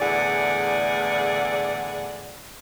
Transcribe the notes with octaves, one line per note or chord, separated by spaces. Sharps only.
E2 A2 D3 G#4 D5 F#5